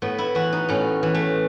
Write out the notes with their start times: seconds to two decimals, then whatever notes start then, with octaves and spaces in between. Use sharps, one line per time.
0.02 A2 B3
0.18 E4
0.35 E3 F#4
0.53 D#4
0.69 A2 C#4
1.03 E3
1.15 A3